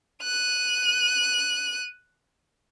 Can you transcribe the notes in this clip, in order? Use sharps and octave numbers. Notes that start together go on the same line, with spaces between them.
F#6 D#7